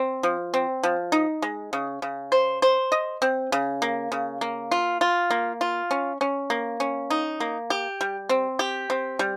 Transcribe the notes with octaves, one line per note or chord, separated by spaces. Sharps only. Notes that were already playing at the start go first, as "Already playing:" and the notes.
Already playing: C4
F3
C4
F3
D#4
G#3
C#3
C#3
C5
C5
D#5
C4
C#3
A#3
C#3
A#3
F4
F4
A#3
F4
C#4
C#4
A#3
C#4
D#4
A#3
G4
G3
C4
G4
C4
G3